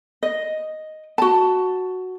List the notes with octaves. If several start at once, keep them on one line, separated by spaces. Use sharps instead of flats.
D#5
F#4 A5